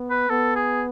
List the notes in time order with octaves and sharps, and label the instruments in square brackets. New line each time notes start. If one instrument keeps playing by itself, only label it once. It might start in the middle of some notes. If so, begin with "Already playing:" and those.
Already playing: [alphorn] B3
[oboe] B4
[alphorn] B3 [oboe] A4
[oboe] G#4